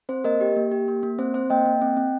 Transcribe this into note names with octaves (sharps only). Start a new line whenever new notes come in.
C4 C5
A#3 A#4 D#5
G4
A#3
G4
A#3
A#3
C4 C5
C4 C5
A#3 D#5 G5
A#3
C4
C4